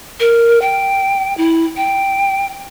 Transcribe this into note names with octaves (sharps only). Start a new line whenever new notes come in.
A#4
G5
E4
G5